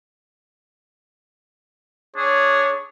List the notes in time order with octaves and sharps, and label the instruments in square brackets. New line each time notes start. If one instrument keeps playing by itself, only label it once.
[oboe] D4 [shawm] G#4 [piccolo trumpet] C#5